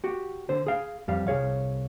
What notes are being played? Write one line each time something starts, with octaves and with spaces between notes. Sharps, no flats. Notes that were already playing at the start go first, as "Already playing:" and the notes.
F#4 G4
D3 C5
G#4 F5
F2 G3 F5
C2 G#4 C#5 F5